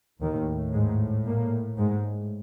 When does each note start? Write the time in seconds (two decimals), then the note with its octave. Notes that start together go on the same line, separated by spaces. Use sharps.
0.22 D#2 A2 D#3
0.73 G#2 G#3
1.25 A#2 A#3
1.78 G#2 G#3